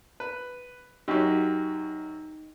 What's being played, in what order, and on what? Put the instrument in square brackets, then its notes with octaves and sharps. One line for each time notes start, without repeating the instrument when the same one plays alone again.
[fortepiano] B4
[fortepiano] F#2 F#3 [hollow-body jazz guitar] D#4 G4